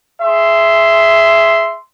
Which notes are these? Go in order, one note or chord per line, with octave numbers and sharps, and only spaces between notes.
G#4 E5 C6